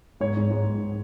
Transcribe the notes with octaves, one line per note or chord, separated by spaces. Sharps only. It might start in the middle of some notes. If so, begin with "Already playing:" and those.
G#2 C#5
G#2
G#2
G#2